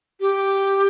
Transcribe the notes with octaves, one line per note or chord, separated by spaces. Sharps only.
G4